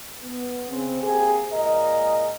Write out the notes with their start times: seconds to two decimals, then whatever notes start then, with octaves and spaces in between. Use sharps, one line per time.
0.23 B3
0.69 C#3 C4
1.03 A#3 C4 G4 G#4
1.53 A#2 G#3 A#4 D#5